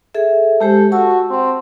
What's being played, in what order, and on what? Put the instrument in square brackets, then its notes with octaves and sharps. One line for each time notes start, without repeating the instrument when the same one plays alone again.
[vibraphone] G#4 A4 E5
[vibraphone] G#3 G4 C5 [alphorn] A4
[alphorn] F#4 [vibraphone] A5 E6
[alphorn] C4